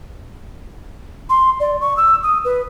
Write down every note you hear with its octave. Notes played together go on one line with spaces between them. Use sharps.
C6
D5
C#6
E6
D#6
B4